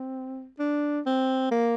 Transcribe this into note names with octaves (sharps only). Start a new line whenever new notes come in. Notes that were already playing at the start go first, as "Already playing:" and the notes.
Already playing: C4
D4
C4
A#3